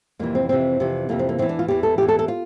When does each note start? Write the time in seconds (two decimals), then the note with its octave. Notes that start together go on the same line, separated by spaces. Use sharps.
0.19 F2 C3 E3 A#3
0.35 C4
0.49 F2 C3 E3 C4
0.80 F2 C3 E3
1.09 F2 C3 E3 A#3
1.19 C4
1.29 A#3
1.38 E2 E3 C4
1.49 D4
1.59 F4
1.68 E2 E3 G4
1.83 A4
1.98 E2 E3 G4
2.08 A4
2.19 A4
2.28 F4